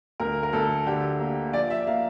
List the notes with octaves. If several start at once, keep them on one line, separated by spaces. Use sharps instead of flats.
D2 A#4
A#4
D2 A4
D3 G4
A#3
F3 D5
E5
A#3 F5